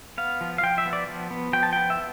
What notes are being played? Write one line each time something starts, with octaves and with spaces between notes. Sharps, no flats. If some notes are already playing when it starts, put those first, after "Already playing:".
B3 F5
F3
F5
F3 G5
E5
B3
D5
F3
B3
F3 G5
A5
B3 G5
E5